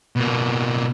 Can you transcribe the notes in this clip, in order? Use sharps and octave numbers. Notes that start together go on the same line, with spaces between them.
B2 A#3